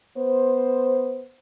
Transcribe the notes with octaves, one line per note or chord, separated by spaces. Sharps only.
B3 C5